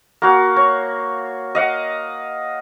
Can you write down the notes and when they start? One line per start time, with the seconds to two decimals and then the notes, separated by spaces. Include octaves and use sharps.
0.22 A#3 F#4 F5
0.56 C#5
1.55 D#5 F5 F#5